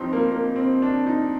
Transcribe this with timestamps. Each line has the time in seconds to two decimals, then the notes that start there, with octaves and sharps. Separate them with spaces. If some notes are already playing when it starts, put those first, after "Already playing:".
Already playing: G2 F3 C4 D#4 G4
0.13 A#3
0.32 A#3
0.56 C4
0.82 D4
1.07 D#4